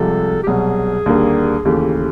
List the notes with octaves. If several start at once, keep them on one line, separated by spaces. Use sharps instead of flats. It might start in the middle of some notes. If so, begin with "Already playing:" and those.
Already playing: C2 C3 F3 G#3 A4
G4
C2 B2 F#3 G#4
D#2 D3 G3 A#3
D#2 C#3 E3 A3 G4